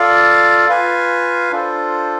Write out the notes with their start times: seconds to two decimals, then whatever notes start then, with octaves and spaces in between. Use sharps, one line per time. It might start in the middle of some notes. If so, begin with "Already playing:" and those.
Already playing: F4 A4 D5 F5
0.69 F4 B4 F5 G#5
1.52 D4 F4 A4 C5